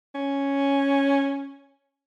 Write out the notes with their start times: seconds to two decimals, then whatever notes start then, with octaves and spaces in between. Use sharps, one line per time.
0.15 C#4